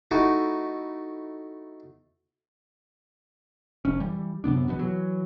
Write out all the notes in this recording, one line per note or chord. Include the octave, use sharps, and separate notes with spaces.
A3 D#4 E4 F#4
F1 C#4
E3 G3
F#2 C3 B3 D4
A#1 B2 E3 B3
E3 F#3